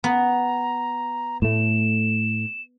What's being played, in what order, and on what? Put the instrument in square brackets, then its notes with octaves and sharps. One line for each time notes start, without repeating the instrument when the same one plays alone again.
[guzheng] B3 [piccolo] A#5
[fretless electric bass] A2 A3 [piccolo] E7